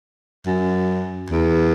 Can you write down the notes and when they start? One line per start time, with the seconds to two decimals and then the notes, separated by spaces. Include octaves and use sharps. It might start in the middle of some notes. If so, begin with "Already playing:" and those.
0.46 F#2
1.30 E2